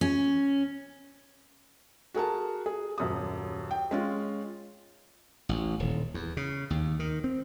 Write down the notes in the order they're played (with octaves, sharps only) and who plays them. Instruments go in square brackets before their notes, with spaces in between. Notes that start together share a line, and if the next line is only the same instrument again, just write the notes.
[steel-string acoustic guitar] C#4
[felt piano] F#4 G#4 A#4 A5
G#4
D#1 F#2 D#6
G5
G#3 C#4 F4
[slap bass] A1
D#1
E2
C#3
D#2
D#3
C4